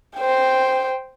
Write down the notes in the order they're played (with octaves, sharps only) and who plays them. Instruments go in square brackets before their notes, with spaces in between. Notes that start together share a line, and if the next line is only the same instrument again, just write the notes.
[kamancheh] C5 G5